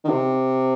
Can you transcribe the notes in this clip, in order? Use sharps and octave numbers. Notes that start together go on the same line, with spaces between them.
D#3
C3